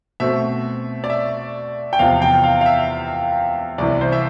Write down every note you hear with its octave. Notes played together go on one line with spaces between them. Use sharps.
B2 A3 C4 E5
D5
E5
G5
E2 C3 F3 F5
G5
F5
F5
E5
C2 C3 E3 D5
C5
E5